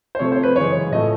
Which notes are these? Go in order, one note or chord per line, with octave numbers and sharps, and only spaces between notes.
C5
C3 F3 A3 C#5
C5
B4
F#2 C#3 E3 G#3 C#5
A2 F3 A3 D#5